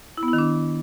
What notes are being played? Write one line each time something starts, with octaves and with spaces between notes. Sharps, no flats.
E4
B3
E4
D#3
D4